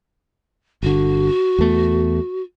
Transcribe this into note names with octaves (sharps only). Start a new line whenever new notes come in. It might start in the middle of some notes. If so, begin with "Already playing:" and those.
G1 D3 F#4
E2 A3 B3